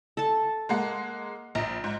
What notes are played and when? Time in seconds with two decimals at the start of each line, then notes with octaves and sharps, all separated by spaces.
0.17 A4 A5
0.69 G#3 A#3 F#5
1.55 A#1 A#5
1.84 G#2